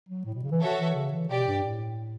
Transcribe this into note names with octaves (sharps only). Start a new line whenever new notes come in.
F#3
A2
B2
C#3
E3
F#4 A4 C#5 E5
E3
C#3
E3
B2 G4 D5 G5
G2
A2